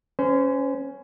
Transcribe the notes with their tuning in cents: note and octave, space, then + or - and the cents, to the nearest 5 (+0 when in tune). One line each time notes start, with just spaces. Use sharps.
C#4 +0 C5 -35